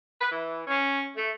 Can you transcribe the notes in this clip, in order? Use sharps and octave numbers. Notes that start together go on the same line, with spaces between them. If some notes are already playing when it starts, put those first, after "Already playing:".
B4
E3
C#4
A3